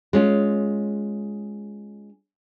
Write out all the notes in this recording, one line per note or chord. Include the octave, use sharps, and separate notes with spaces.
G#3 C#4 F4